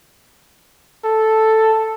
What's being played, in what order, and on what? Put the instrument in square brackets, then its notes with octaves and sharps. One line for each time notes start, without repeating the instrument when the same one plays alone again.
[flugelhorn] A4